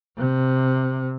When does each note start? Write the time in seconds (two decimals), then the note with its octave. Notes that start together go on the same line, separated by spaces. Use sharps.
0.18 C3